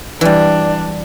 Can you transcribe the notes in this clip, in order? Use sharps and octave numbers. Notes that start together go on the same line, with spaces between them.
E3 G3 D4